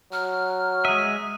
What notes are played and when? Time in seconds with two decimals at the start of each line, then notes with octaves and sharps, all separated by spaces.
0.13 F#3 F6
0.85 G#3 E5 D#6 D#7